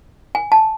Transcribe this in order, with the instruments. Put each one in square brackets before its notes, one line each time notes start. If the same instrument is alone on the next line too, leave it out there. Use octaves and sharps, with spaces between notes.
[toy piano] G#5
A5